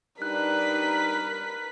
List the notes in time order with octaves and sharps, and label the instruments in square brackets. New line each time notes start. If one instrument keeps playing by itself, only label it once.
[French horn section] G3 D4 D#4 [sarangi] A#4 [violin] B4 B6 [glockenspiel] F#6